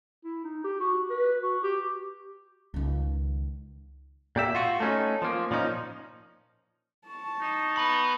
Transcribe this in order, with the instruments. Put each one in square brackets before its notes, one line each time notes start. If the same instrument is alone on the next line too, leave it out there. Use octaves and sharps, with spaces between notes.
[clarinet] E4
D#4
G4
F#4
B4
F#4
G4
[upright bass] C#2 D#3
[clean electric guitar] A#2 G4 E5
F4 F#4
A3 C#4 D#4
F3 A#3
A#2 F3 C#4 D#4
[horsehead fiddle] A5 [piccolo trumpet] C#6
[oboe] D#4
[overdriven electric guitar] B3 B5